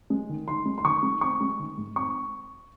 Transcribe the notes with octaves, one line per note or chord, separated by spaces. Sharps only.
G#3
D#3
D#3 C6
G#3
C6
D#3 C#6
G#3
C4 C#6
G#3
D#3
G#2
C4 C#6